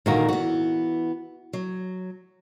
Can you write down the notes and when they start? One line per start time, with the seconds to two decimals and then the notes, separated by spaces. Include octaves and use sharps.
0.06 A#2 D3 D#3 F#4
0.29 E3 B3 F#4
1.53 F#3